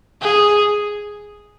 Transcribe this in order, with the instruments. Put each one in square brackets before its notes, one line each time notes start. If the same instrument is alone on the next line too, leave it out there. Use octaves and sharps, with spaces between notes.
[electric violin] G#4